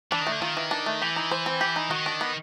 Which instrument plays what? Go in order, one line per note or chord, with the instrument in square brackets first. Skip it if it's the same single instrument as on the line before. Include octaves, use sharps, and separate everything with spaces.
[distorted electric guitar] E3 [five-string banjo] D4
[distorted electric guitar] D#3
[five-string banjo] A3
[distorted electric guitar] D3
[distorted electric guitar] D#3 [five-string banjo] F4
[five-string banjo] E3
D4
A3
[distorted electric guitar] E3 [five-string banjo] G4
[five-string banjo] D#4
C5
C4
G4
D#4
[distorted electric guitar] D#3 [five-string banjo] F#4
[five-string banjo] D4
B3